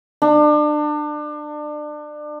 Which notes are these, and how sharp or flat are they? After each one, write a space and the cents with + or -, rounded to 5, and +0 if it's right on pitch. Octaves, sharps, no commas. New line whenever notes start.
D4 +30